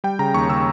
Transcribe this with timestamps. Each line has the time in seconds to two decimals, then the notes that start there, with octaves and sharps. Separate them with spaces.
0.04 G3 G5
0.19 C#3 A#5
0.34 D#2 C#6
0.50 C#3 E6